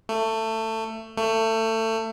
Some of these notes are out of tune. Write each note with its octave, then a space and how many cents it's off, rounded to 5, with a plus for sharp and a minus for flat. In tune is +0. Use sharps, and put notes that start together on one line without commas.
A3 +20
A3 +25